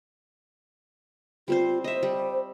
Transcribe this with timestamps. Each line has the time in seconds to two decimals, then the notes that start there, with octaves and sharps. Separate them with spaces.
1.48 G3 C4 F4 C5
1.84 C5 D#5 E5
2.03 G3